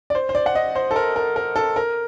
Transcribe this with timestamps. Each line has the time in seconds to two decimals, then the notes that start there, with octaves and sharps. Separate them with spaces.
0.10 D5
0.15 C5
0.29 C5
0.35 D5
0.46 F#5
0.55 D#5
0.75 C5
0.91 A4
0.96 A#4
1.16 A#4
1.36 A#4
1.56 A4
1.76 A#4